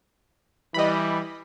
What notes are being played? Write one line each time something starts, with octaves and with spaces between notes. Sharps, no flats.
E3 G3 D#5 B5